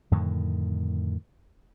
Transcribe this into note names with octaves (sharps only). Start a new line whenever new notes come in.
F2 A2 D3 D#3